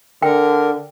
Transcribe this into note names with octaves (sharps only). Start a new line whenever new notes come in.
D3 A#4 G5